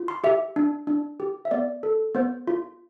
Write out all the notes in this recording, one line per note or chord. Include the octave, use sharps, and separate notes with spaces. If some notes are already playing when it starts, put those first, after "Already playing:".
Already playing: F4
C6
G4 E5
D4
D4
G4
E5
B3 D5
A4
B3 C5
F4